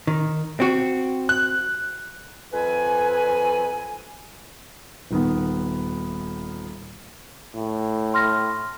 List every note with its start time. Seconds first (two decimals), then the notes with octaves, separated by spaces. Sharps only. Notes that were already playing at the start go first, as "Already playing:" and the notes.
0.07 D#3
0.60 C4 F#4
1.29 F#6
2.53 F2 B4 G#5
5.11 D#1 D#3 B3
7.56 A2
8.14 C6 F6 A#6